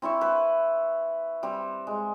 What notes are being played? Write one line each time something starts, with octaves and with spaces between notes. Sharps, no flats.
C4 E4 E5 C#6
B4
G3 C4
G#3